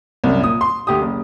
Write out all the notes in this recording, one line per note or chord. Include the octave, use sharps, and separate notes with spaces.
C2 F#2
A#2 D#6
C6
D2 G4 D#6
F#1